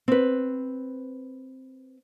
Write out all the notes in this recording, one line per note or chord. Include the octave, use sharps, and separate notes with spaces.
C4 B4